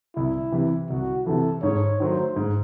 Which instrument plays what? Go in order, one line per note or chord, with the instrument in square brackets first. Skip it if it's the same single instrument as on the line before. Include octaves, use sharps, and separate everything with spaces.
[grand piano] C2 [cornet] E4
[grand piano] C3 E3
[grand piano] C2 [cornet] F#4
[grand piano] C3 E3 [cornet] A4
[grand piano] G#2 [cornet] C#5
[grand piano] D#3 F#3 A3 [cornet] C5
[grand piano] G#2